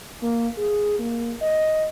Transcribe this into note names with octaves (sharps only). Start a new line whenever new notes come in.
A#3
G#4
A#3
D#5